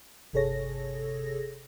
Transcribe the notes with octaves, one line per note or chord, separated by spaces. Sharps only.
G1 C3 G#4 A4 C#5 A#6